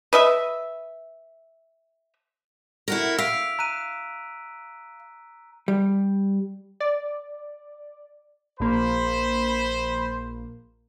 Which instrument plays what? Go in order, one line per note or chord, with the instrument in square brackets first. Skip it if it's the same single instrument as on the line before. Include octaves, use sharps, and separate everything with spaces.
[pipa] B4 D#5 E5
[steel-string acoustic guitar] E4 F#4 A#4
[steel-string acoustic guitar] F5 [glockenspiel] E6 B6 D7
[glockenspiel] A#5 F#6 D#7
[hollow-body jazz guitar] G3
[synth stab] D5
[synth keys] A#1 A#3 [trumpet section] C5 B5